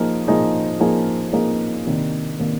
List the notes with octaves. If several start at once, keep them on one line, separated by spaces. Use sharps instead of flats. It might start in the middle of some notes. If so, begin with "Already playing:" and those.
Already playing: F3 A#3 D#4 G#4
F3 A#3 D#4 G#4
F3 A#3 D#4 G#4
F3 A#3 D#4 G#4
C3 D#3 A#3 D4
C3 D#3 A#3 D4